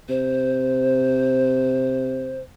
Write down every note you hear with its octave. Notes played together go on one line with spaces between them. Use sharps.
C3 C5